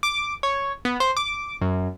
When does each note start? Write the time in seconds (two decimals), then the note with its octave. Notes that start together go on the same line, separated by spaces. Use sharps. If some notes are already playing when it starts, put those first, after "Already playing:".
0.03 D6
0.43 C#5
0.85 B3
1.00 C5
1.17 D6
1.61 F#2